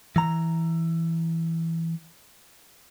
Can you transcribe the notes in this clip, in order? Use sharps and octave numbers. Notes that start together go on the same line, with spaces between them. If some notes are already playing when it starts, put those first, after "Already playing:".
E3 A#5